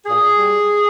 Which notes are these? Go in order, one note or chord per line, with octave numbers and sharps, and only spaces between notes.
A#2 G#4
G3